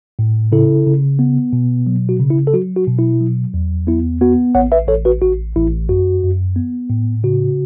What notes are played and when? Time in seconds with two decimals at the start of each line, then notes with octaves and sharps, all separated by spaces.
0.19 A2
0.52 C#3 E4 A4
0.86 C#3
1.19 B3
1.53 B2
1.87 F#3
2.09 F#4
2.19 C#3
2.31 E4
2.47 A4
2.54 F#3 F#4
2.76 F#4
2.88 B2
2.99 E4
3.21 F#3
3.54 E2
3.87 B3 E4
4.21 B3 F#4
4.55 A1 C#5 F#5
4.72 B4 E5
4.88 A1 A4 C#5
5.05 F#4 B4
5.22 A1 F#4
5.56 A1 E4
5.89 F#2 F#4
6.23 F#2
6.56 B3
6.90 A2
7.24 C#3 F#4